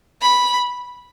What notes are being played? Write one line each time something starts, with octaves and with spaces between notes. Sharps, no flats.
B5